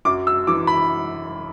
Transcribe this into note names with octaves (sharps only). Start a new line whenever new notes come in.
F#2 D6
E6
E3 D6
B5